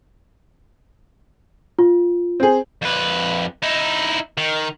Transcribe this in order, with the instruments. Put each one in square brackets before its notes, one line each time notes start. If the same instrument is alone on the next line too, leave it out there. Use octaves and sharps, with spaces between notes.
[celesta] F4
[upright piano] C4 G#4
[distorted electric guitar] F2 B4
D#4 E4
D#3